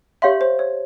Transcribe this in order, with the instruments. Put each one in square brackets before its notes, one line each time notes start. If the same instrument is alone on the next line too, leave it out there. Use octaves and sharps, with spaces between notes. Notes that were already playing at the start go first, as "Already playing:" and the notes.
[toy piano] G4 C#5 F5 C6 [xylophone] E5
[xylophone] C5
C#5